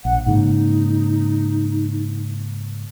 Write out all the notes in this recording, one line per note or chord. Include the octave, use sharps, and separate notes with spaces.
A#1 F#5
G#2 C#3 A#3 D#4